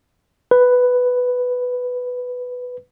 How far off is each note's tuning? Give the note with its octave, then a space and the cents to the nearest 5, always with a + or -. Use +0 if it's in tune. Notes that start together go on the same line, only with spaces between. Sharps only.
B4 +5